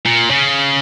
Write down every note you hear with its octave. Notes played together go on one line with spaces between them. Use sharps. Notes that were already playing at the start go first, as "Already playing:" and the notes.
A#2
C#3